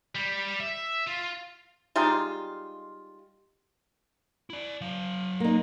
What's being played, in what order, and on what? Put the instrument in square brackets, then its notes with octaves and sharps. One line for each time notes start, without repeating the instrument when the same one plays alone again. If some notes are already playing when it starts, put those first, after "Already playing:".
[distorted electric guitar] G3
E5
F4
[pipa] G3 G#3 D#4 F4
[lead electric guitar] E4 D5
F#3 F5
[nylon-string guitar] A#3 D#4